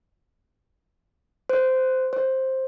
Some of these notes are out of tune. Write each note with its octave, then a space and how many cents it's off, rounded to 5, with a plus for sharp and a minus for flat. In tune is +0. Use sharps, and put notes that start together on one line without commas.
C5 -15
C5 +10